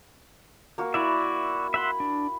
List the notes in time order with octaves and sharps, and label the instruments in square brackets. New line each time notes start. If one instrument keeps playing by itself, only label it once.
[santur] A#3 F#4
[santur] E4 [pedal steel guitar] F#4 D5 E5
[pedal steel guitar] E5 F#5 C6 [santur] B5
[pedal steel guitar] D4